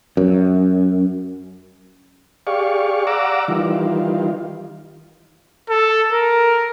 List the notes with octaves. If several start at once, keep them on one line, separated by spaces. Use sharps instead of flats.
F#2
G4 G#4 D5 F5 C#6
D5 F5 F#5 A#5 D6 E6
D#3 E3 G3 F4
A4
A#4